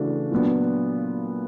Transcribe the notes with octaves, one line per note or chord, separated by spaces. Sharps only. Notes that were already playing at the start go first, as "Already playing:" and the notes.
Already playing: C#3 E3 A3 D4 F#4
A#2 F#3 B3 D4